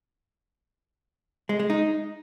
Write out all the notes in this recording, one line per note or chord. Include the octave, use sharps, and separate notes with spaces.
G#3
G#3
D#4